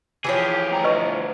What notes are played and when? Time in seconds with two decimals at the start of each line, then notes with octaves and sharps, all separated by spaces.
0.24 E3 F3 G4 G#4 C#5
0.71 D2 A#5
0.84 B4 D#5 C#6